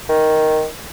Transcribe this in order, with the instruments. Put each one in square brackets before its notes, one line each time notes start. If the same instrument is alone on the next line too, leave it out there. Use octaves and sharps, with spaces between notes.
[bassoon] D#3